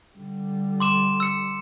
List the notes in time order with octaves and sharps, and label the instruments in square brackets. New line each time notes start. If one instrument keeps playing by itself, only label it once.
[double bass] D3 G3
[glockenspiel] C6 D6 E7
E6 C#7